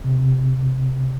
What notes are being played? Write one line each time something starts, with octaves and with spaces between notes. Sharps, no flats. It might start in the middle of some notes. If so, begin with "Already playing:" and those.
C3